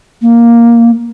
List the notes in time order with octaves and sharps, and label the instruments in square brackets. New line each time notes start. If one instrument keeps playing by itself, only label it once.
[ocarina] A#3